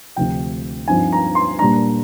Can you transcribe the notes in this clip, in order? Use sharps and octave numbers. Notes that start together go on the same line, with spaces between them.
D2 C3 F3 G5
G2 F3 C4 D#4 G#5
A#5
C6
A#2 G3 D4 A#5